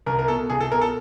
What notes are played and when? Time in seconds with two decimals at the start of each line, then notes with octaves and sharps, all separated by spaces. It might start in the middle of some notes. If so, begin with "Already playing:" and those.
0.06 C2 A#4
0.19 A#4
0.28 B2 A4
0.50 C2 G#4
0.61 A4
0.71 B2 A#4
0.81 A4